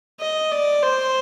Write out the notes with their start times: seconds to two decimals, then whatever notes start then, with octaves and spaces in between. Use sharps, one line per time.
0.21 D#5
0.52 D5
0.83 C5